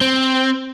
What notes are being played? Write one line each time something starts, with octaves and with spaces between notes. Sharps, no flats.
C4